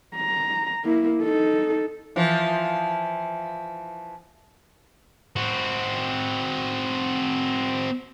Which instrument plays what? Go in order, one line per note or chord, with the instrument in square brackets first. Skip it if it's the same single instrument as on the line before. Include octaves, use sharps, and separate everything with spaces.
[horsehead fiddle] A#5
A#3 E4
D#4 A4
[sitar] E3 F3
[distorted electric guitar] C4 F#4